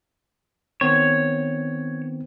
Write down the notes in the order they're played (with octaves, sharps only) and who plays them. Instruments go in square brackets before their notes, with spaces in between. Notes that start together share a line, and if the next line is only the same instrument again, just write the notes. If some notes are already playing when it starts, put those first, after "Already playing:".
[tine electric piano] D#3 B3 C4 [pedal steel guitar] C#5